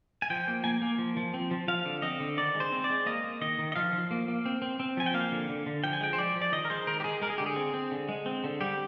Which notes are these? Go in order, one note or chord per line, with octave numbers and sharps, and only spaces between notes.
G#5
F3 G5
A#3
A#3 G#5
A#3
F3
F3
C4
F3
F3 F5
D3
C4 D#5
D3
D#3 D5
G#3
C5
C4
D5
G#3
A#3 D#5
A#3
D#3 D#5
D#3
D#5
F3 F5
F3
A#3
A#3
C4
C4
C4
F3 G#5
G5
A#3 F5
D3
D3
D3
F3 G5
G#5
G#3 G5
C5
F3 D5
F3
D5
D#3 D#5
A#4
G#3 C5
D#3 A#4
G4
G#3 G#4
G#3 A#4
G#4
D3 G4
G#4
C4
C4
D3
G#3
C4
D3
G3 G4